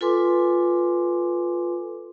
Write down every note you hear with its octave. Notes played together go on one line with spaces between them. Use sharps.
F4 A4 B4 G#5 C6 D6